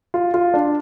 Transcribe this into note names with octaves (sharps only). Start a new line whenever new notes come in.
F4
F4
D4